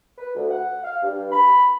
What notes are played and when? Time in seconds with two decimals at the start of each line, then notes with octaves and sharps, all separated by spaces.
0.18 B4
0.34 D2
0.49 F#5
0.83 F5
1.03 G2
1.30 B5